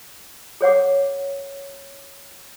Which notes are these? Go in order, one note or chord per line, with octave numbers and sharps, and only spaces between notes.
G#4 C#5 F#5 D6